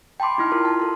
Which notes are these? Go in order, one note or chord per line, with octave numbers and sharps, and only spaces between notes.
G5 A5 B5 C6 D6
D#4 E4 F6
F4 A#4 C6
A5
A4 A5